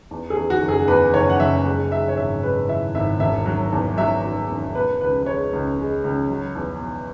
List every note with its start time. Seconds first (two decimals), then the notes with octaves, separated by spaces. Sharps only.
0.11 E2
0.30 G#4
0.37 E2
0.50 F#4
0.62 F#1
0.68 G#4
0.88 E2 B4
1.14 F#1 C#5
1.30 F#5
1.40 F#1 E5
1.65 G#3
1.92 G#3 E5
2.08 C#5
2.17 G#1 E5
2.43 G#3 B4
2.69 E3 E5
2.95 G#1 E5
3.20 E1 E5
3.46 F#3
3.72 E2
3.97 F#3 E5
4.24 F#3
4.50 E1
4.75 B2 B4
5.01 C#2 B4
5.22 B4
5.26 G#3 C#5
5.53 C#2
5.78 G#3
6.04 C#2
6.30 F#3
6.55 E2
6.81 B2